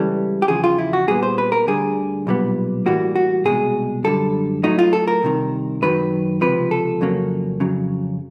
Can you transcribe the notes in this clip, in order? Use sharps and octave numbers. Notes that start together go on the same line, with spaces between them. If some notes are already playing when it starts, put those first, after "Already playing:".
Already playing: C#2 C#3 E3 G3 A4
G4
E2 C#3 F3 G#4
F4
E4
F#4
A#2 G3 B3 G#4
C5
B4
A#4
D2 D3 G3 G#4
B1 A#2 G3 B3
A2 E3 G3 A#3 F#4
F#4
C2 B2 G#3 G#4
F#2 D3 G3 A4
A2 F#3 A3 D#4
F4
A4
A#4
C2 C3 D#3
F#2 D#3 F#3 B4
C#2 C3 F3 B4
A4
F2 C#3 F#3 A#3
F2 C#3 F#3